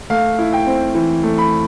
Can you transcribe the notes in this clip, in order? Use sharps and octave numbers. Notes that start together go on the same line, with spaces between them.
A3 F5
E4
G5
C4
E3
A3
B5